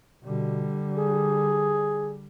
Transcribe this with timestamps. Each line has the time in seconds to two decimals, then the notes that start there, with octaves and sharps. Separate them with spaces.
0.25 B2 D3 G3
0.97 G#4